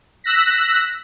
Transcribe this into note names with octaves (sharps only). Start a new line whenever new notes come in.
E6 F#6 A#6 B6